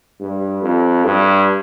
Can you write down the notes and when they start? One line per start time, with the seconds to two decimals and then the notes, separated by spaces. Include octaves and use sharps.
0.20 G2
0.62 F2
1.04 G2